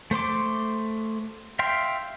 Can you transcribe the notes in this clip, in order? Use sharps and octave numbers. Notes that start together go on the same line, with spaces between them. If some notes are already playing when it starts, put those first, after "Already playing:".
A3 C5 C6 D6
E5 F5 G5 C6